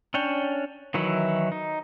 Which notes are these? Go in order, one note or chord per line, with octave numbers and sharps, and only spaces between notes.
C#4 D4 C#5 G5
D#3 E3 F#3 E4
D#4